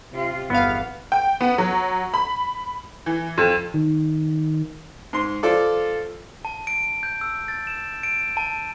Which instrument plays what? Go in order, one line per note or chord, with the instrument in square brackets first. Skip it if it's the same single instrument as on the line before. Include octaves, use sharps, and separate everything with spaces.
[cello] C3 F4
[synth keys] G1 F5 [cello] E2 [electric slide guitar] B3
[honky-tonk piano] G5
B3
F#3
B5
E3
F2
[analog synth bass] D#3
[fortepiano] G#2 C6
F3 F4 A4 D5
[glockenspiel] A5
D7
G6
E6
A6
E7
D7
A5